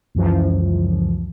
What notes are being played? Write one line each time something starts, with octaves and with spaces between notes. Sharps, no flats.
C#2 F#2 E3 F3